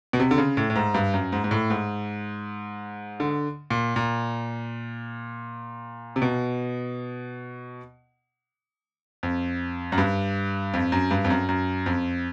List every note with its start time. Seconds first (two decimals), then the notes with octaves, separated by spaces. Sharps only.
0.13 B2
0.20 C3
0.31 D3
0.38 C#3
0.57 A2
0.70 A2
0.76 G#2
0.94 G2
1.14 F#2
1.32 G#2
1.44 G#2
1.51 A2
1.70 G#2
3.20 D3
3.70 A#2
3.96 A#2
6.16 C3
6.22 B2
9.23 F2
9.92 F#2
9.98 G2
10.73 F2
10.92 F#2
11.11 G2
11.24 F2
11.30 F#2
11.49 F#2
11.86 F2